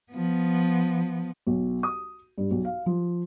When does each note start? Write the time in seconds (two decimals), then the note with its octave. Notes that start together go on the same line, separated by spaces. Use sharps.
0.12 F3 B3
1.46 B1
1.83 D#6
2.38 G2
2.51 B1
2.65 F5
2.86 F3